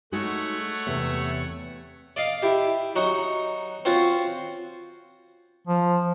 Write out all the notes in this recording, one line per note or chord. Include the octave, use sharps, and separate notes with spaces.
G#3 A3 D#4 F#4 C#5 F#5
E2 C3 E5
D5 D#5 F5
E4 G4
F#3 D#4 F#4
C4 C#4 F4 F#4
F3